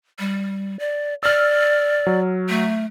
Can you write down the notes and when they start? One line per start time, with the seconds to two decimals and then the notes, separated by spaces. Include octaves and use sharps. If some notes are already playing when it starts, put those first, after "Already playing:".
0.19 G3
0.80 D5
1.23 D5 E6 F6
2.07 F#3
2.49 A3